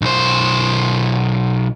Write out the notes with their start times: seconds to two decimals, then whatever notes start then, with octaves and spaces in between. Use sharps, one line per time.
0.02 B1 C5